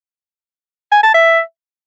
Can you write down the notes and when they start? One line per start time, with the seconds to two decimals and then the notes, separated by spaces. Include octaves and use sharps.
0.92 G#5
1.03 A5
1.14 E5